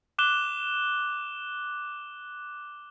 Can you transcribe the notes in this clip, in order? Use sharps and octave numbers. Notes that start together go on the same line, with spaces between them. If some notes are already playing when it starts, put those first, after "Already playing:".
D6 F#6 E7 G7